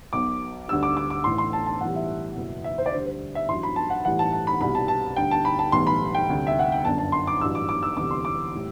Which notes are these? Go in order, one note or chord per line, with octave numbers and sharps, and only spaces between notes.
B1 B2 F#3 D6
D2 D3 G3 E6
D6
D6
D6
A1 A2 E3 C6
C6
A5
A5
B1 A2 E3 G3 F#5
E5
F#1 E2 B2
E5
C5
D5
D2 D3 G3 C5
C5
E5
A1 G2 F#3 C6
B5
A5
F#5
A1 A2 E3 G3 F#5
A5
A5
B5
C2 B2 G3 B5
A5
A5
D2 D3 G3 G5
A5
B5
A5
B1 A2 E3 G3 C6
B5
G5
D2 C3 G3
E5
F#5
G5
G1 F#2 D3 A5
A5
C6
D6
A1 G2 F#3 E6
D6
D6
E6
E1 D2 C3 E3 G3 D6
C6
D6
A2 G3